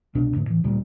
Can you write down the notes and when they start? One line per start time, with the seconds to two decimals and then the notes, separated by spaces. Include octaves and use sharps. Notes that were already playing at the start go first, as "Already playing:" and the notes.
0.15 C2 B2 D4
0.35 D2 G#2 D3
0.47 A2 E3
0.64 D1 D2 A#2 G3